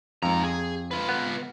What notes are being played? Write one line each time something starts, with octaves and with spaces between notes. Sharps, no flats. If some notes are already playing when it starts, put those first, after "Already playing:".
F2 G#2 A#5
G#4
F4 B4
B3